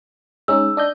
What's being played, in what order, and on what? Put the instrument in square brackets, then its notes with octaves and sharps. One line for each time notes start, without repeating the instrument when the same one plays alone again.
[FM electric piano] G#3 C#4 D#4 [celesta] E6
[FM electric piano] D4 D#5 G6